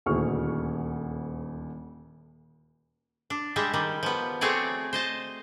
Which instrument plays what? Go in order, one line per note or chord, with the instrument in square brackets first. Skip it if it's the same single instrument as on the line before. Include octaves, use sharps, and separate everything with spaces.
[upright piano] D#1 D2 E4 G#4 C#6 F6
[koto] D4
G3 G#3 E5
D#3 G3
F3 B3
A3 C4 F#4 G#4 C#5 D5
C5 D#5 A5